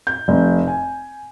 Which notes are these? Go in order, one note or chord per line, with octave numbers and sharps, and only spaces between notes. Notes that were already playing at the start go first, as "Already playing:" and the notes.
G6
F1
G#5